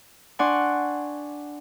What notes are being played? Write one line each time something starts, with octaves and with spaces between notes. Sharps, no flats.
D4 D5 F#5 G#5 C6 C#6